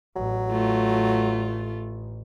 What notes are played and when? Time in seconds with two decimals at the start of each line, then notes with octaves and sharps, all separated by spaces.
0.16 A1 F#3
0.51 A3 F4